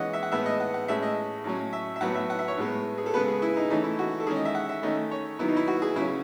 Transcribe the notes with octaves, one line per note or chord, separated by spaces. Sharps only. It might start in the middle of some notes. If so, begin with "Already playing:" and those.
Already playing: E3 G#3 C#4 D#5 F#5
E5
F#5
A2 G#3 B3 E5
D#5
F#5
F#5
A2 G#3 C#4 E5
D#5
A2 F#3 C#4
E5
E5
A2 F#3 B3 F#5
E5
F#5
E5
C#5
A2 G#3 B3
G#4
A4
C#3 G#3 B3 B4
G#4
E4
D#4
E3 A3 C#4 D#4
E4
F#4
A4
D#3 G#3 C#4 G#4
D#5
E5
F#5
E5
D#3 A3 C#4 D#5
C#5
D#3 F#3 B3 E4
D#4
E4
F#4
G#4
C#3 F#3 C#4 E4